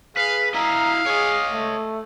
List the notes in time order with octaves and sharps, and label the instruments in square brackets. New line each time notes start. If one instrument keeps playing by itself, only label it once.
[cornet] G#4 [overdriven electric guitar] B4 [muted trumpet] F5
[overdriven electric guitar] E4 D#5 [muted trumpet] F5 [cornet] A#5
[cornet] G#4 [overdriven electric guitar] C#5 D#5
[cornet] A3